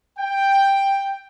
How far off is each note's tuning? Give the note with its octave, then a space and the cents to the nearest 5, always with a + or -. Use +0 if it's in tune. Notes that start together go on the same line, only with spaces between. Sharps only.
G5 +5